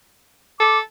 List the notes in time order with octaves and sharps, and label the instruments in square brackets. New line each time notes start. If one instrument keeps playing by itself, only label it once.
[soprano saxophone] A4 [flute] D6